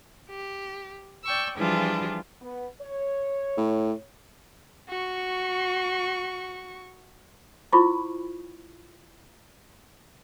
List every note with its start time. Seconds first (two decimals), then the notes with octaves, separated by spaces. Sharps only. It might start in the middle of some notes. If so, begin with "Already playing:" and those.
0.30 G4
1.24 D5 G5 C#6 E6
1.57 E3 F3 G3 D4 F4 G#4
2.41 B3
2.82 C#5
3.57 A2
4.89 F#4 C#6
7.72 E4 F4 C5 B5 C#6 D6